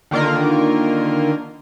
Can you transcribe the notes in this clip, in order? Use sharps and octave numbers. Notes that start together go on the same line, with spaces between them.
D3 D#3 A#3 F4 A#4